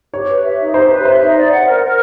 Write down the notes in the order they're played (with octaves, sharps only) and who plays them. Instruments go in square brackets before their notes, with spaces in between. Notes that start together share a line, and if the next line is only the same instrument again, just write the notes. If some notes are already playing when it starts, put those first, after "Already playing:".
[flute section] G4 [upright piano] C#5
[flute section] B4
E5
D#4
[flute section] G4 [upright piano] C5
[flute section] B4
[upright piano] C5 [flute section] E5
[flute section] D#4
D5
F#5
A#4
A#4